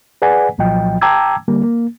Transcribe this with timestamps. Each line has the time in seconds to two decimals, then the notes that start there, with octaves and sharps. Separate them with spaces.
0.22 G#4 B4 D5 F#5 G#5
0.58 C2 A#2 F3 F#3 D#5 G5
1.01 G5 A5 A#5 D6 E6 G#6
1.48 D3 G3 A#3
1.64 A#3